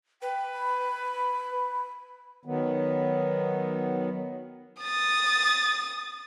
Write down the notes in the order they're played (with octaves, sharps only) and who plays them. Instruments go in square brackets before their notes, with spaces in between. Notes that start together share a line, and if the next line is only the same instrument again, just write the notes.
[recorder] B4 [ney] G5
[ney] B5
[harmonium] D#3 F#3 B3
[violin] D#6 A6